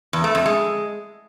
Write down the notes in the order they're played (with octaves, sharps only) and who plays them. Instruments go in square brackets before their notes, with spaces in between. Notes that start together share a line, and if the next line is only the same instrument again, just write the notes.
[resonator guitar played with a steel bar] E2
A3
F2
G#3